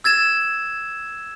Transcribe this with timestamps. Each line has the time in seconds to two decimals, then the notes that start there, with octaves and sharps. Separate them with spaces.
0.04 E6 G#6 A6 E7